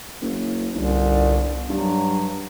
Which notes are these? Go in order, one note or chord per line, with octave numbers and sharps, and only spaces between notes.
F#1
G1 C2
G2 F#3